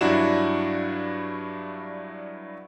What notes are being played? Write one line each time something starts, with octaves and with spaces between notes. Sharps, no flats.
G2 F#3 D4 E4 F#4 E7